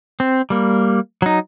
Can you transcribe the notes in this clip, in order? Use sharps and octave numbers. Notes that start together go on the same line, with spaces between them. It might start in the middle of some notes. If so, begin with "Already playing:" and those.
C4
G3 A#3
F#3 D#4